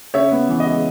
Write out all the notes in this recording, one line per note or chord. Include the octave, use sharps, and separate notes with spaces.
C#3 C#5 E5
B3
E3
D#5
G#3